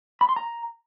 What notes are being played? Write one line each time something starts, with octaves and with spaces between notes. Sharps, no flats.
B5
C6
A#5